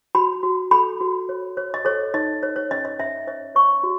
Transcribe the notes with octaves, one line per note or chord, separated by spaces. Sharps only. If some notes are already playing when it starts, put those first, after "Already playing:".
F#4 B5
F#4
A4 B5
F#4
C#5
C#5
D#5
A4 C#5
D#4 D#5
C#5
C#5
C#4 D#5
D#5
C#4 E5
C#5 D#5
C#5 C#6
F#4